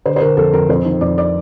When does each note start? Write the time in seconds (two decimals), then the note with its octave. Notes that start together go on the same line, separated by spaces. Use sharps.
0.06 D3 C5
0.16 C5
0.21 D3 A#4
0.37 F2 A4
0.53 F2 A#4
0.69 F2 C5
0.85 D#3
1.01 F2 D5
1.18 D5